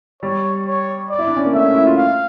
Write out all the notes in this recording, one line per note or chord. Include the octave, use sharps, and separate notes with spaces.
G3 C#5
C#5
D5
E4
D4
C#4
A#3
A3 E5
C#4
E4
F4
F5